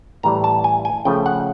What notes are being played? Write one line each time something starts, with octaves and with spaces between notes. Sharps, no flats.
A2 E3 G3 A#5
A5
G#5
G#5
C#3 F3 A3 G5
F#5